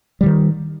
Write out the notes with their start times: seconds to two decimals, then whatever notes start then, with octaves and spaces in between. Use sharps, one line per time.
0.21 G3
0.23 E3
0.26 D#3